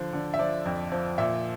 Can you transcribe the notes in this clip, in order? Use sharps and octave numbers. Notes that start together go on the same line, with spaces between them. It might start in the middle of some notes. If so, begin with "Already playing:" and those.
Already playing: D3 F3
D3
E5
F3 D5
F2
F3
A#2 E5